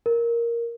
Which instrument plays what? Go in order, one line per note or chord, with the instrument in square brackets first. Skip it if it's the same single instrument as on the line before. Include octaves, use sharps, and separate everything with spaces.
[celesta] A#4